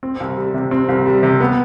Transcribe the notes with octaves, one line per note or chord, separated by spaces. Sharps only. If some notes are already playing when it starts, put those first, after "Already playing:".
C4
C2
G3
C3
C4
C2
G3
C3
B3